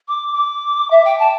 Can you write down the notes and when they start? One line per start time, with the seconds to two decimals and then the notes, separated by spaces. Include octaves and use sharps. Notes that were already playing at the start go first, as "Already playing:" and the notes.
0.08 D6
0.32 D6
0.91 E5
1.05 G5
1.19 A5